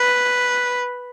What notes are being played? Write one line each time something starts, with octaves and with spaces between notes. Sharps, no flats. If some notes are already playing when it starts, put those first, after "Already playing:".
Already playing: B4